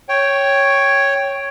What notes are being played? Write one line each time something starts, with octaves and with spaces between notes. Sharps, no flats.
C#5 G5